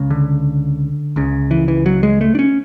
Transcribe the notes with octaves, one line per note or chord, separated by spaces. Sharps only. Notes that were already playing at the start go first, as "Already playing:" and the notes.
Already playing: C#2 C#3
D3
C#2 C#3
E3
E3
F#3
G#3
A3
D4
C#4